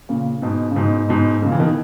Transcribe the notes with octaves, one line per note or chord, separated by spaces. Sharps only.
A#2 C#3
G#2 B2
C#3
G#2 B2
G#2 B2
A#2 C#3
E3
B2 D#3